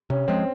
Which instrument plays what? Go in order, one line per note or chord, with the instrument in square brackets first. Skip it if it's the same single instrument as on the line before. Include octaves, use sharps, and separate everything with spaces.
[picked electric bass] C3 [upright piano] C#4
[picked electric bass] F3 G#3 [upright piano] C4